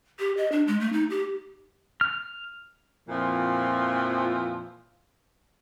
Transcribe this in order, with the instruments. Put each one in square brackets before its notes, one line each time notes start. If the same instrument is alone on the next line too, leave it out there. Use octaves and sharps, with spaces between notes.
[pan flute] G4
D#5
D4
G#3
A3
D#4
G4
[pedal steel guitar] F6
[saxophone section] F2 A#2 E3 F3